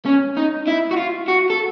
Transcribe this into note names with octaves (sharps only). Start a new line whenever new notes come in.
C#4
D#4
E4
F#4
F4
F#4
A4